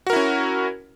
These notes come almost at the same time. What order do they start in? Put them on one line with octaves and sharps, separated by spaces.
F#4 A#4 E4 C#4